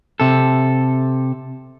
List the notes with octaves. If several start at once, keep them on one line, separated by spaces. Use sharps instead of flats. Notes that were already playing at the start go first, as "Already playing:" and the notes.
C3 A4